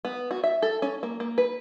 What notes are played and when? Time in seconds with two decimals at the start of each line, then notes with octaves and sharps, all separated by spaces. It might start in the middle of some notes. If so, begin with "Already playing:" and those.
0.05 B3
0.31 F#4
0.44 E5
0.62 A4
0.82 C#4
1.03 A#3
1.20 A#3
1.38 B4